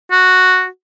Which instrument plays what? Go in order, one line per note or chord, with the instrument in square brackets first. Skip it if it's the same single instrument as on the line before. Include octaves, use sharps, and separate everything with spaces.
[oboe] F#4